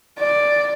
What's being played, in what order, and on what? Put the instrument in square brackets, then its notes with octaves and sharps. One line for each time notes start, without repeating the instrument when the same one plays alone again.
[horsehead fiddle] D5